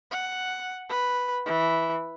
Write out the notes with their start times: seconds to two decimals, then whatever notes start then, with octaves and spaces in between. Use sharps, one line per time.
0.11 F#5
0.89 B4
1.46 E3